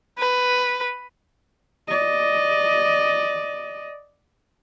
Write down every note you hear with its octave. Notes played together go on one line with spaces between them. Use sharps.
B4
D5 D#5